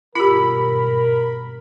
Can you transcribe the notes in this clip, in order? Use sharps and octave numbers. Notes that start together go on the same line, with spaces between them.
G#1 G2 B2 F4 G4 A#4 B5